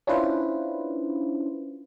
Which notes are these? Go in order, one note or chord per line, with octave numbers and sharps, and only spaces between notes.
C#4 D4 E4 F4 B4 C5